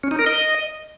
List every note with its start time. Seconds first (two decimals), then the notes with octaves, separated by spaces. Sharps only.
0.04 C#4
0.11 D#4
0.19 A#4
0.26 D#5